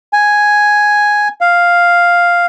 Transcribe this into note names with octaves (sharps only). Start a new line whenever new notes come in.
G#5
F5